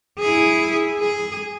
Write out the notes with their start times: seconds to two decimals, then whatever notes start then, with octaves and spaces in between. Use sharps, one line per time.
0.19 E4 G#4
1.00 G#4